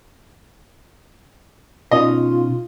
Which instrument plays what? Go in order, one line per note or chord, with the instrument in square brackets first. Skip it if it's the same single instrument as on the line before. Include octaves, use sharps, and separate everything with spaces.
[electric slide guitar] B2 C#4 D#4 [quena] F4 [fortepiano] D#5